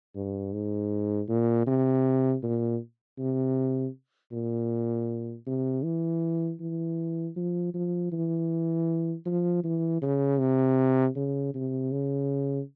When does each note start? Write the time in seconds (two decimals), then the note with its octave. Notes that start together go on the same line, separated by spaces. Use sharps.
0.15 G2
0.53 G#2
1.29 A#2
1.67 C3
2.43 A#2
3.19 C3
4.32 A#2
5.47 C3
5.84 E3
6.60 E3
7.36 F3
7.74 F3
8.12 E3
9.26 F3
9.64 E3
10.02 C#3
10.40 C3
11.16 C#3
11.54 C3
11.92 C#3